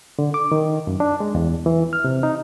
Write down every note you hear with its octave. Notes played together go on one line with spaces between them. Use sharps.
D3
D6
D#3
F#2
D4
G#3
E2
E3
F6
C3
D#4